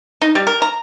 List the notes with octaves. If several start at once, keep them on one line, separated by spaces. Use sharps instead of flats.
D#4
G3
A#4
A#5